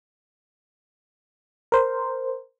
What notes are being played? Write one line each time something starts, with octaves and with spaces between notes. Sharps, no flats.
A#4 C5